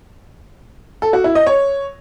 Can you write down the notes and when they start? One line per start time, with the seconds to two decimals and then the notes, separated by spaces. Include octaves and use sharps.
1.02 A4
1.13 F#4
1.24 E4
1.35 D#5
1.47 C#5